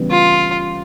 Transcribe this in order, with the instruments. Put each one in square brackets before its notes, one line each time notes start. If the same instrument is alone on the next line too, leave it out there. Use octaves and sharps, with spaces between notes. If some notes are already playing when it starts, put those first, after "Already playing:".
Already playing: [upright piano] C#3 E3 G3 B3
[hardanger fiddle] F4